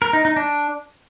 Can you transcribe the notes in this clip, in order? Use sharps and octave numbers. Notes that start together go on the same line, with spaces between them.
A#4
D#4
D#4
D4